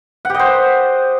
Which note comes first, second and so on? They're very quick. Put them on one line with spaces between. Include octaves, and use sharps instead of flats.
F#5 G4 D#5 C5